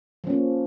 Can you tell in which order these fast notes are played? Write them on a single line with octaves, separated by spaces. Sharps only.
F3 C#4 A#3